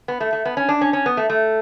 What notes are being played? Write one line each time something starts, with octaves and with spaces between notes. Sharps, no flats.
B3
A3
A3
B3
C#4
D4
C#4
C#4
B3
A3
A3